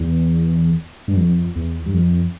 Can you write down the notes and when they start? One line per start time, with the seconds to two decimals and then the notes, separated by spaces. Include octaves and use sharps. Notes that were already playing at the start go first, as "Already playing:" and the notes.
Already playing: E2
1.08 G2
1.17 F2
1.55 E2
1.86 G2
1.94 F2